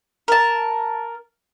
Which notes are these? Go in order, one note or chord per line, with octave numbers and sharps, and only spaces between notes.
A#4 A5